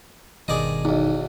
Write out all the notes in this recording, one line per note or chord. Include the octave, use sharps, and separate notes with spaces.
G1 B2 D#3 G#4 D5 D#5
B1 E2 D#4